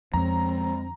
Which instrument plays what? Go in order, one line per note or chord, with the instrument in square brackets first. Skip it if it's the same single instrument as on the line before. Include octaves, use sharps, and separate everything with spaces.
[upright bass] F2 D3 [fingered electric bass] F3 G#3 [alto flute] C4 [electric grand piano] A#5